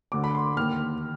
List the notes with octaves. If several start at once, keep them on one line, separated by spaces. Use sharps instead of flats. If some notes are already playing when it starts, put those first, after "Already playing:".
D2 D3 D6
B5
C6
D#2 D#3 F6